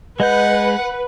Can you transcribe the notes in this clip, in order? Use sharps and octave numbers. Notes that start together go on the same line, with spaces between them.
G#3 B4 D#5 F#5 G6